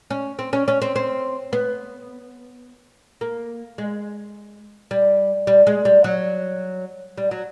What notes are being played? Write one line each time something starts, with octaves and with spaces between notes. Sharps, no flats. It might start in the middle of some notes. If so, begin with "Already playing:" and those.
C#4
C4
C#4
C#4
C4
C4
B3
A#3
G#3
G3
G3
G#3
G3
F#3
G3
F#3